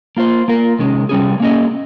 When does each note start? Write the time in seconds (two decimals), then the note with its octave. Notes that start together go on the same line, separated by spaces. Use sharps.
0.17 A#3 F4 C5
0.48 A#3 F4 A#4
0.79 C3 D#3 G#3 C#4
1.09 C3 G3 C#4 G#4
1.40 A#3 C#4 G#4 D#5